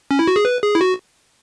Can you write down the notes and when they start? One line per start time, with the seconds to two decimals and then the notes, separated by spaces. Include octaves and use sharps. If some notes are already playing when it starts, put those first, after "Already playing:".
0.11 C#4
0.19 E4
0.28 F#4
0.36 G#4
0.45 B4
0.63 G#4
0.75 E4
0.81 F#4